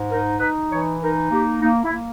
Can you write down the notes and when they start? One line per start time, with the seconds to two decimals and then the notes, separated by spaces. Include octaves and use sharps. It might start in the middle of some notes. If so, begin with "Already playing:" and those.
Already playing: G#2
0.09 D#4 A#4
0.39 D#4 B4
0.70 E3 C#5
1.00 D#4 A#4
1.31 A#3 G4
1.61 A#3 D#4
1.84 E4
1.92 A#3